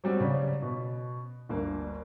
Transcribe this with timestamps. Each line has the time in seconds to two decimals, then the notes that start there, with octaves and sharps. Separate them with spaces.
0.04 F#3 G3 C4 F#4
0.20 C#3 C#4 D5
0.62 B2
1.49 G1 D2 A#3